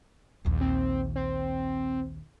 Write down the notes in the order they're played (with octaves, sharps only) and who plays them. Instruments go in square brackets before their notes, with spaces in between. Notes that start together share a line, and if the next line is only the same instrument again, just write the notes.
[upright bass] A#1 D#2
[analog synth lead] C4
C4